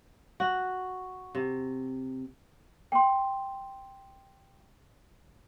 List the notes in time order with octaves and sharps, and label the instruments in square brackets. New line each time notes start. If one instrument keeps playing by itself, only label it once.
[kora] F#4
C3
[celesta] G5 C6